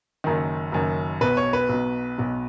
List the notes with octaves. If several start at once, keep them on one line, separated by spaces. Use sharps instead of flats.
F#1 F#2 D#3
F#1 F#2 D#3
B1 B2 B4
C#5
B4
B1 B2
B1 B2